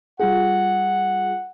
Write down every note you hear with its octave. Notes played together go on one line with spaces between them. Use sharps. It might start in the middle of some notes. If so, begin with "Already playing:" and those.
G3 F4 G#4 F#5